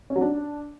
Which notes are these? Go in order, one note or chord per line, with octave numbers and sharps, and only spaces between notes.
C#4
F#3
D4